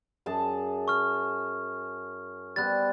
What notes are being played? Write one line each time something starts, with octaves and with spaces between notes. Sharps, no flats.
F#2 G#4 A5
C#6 F6
G3 B3 C5 F#6 A6